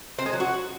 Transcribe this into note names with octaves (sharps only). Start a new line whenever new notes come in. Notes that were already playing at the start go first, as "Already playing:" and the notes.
C4
G#3
F#3
F#4